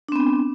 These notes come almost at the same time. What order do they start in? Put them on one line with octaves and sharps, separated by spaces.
D4 C4 B3